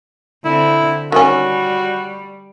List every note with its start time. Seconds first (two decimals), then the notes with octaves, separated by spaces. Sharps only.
0.45 D3 C4 E4
1.12 D#3 G3 C#4 F#4